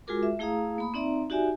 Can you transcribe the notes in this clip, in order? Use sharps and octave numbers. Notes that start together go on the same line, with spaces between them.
G#3 F4 F#4 G#4 A#4 D6
E5
A3 E4 G#4 F5 A#5 D#6
A#3 B5 D#6
C4 D#4 D5 E5 A#5
D#4 F#4 G4 D5 E5 G#5